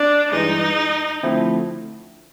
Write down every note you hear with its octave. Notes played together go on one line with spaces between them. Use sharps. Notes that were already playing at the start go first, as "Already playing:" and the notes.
Already playing: D4
G2 E3 G#3 D#4
D3 F3 A3 C4 E4